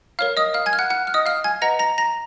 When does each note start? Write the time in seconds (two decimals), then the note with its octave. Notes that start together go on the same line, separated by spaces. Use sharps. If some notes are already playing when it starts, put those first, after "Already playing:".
0.19 A#4 C#5 F5 F6
0.37 D#5 D#6
0.54 F5 F6
0.66 G#5 G#6
0.73 F6
0.79 F#5 F#6
0.90 F#5 F#6
1.07 F6
1.14 D#5 D#6
1.26 F5 F6
1.44 G#5 G#6
1.62 B4 D#5 F#5 A#5 A#6
1.79 A#5 A#6
1.98 A#5 A#6